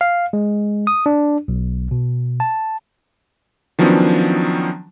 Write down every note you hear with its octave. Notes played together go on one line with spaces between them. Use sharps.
F5
G#3
D#6
D4
B1
B2
A5
D#3 F3 F#3 B3 C#4 D4